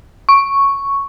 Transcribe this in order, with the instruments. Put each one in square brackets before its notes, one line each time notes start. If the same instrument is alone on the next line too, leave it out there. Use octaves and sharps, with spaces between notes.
[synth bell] C#6